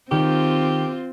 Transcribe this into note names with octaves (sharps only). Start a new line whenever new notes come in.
D#3 C4 F4 G4